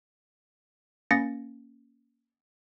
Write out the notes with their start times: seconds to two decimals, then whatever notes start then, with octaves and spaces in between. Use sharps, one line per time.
1.11 A#3 C#4 A6 A#6 C#7